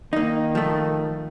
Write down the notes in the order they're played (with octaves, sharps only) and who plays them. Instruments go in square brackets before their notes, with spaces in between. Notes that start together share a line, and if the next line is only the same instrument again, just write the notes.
[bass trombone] D#3 [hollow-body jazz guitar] A#3 D#4
[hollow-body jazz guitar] F3 A3